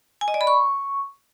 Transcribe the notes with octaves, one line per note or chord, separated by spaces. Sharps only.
G#5
D#5
D5
B5
C#6